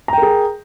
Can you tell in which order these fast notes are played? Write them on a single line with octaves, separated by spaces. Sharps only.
A#5 G5 A#4 G#4